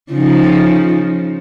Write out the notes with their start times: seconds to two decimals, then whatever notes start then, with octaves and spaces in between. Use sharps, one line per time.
0.13 C#3 F3 D#4